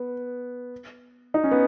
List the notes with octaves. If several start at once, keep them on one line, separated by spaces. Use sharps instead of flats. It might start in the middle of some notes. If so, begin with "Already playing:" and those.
Already playing: B3
D#4
C#4
B3